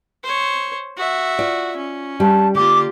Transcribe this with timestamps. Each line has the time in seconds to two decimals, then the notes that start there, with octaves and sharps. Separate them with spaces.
0.24 C5 C#5
0.97 F#4 E5
1.39 F4 D5
1.77 C#4
2.20 G3 A5
2.55 D3 A#3 F4 G4 D6